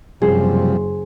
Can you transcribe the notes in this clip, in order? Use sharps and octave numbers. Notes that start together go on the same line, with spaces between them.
F#1 C3 F3 G3 G#4 C5